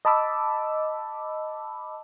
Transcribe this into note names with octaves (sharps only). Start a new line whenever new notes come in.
D#5 A5 B5 D6 E6